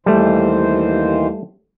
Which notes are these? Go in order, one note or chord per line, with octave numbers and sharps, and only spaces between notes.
D#2 E3 G3 A3 C5